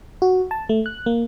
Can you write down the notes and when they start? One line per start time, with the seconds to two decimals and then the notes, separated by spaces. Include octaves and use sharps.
0.22 F#4
0.51 A5
0.69 A3
0.86 F#6
1.06 A#3